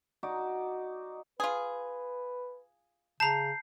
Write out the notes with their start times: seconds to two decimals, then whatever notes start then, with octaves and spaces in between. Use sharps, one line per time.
0.23 D#4 F#4 D5
1.40 F4 G#4 B4
3.20 C#3 A5 A#5 G6 C7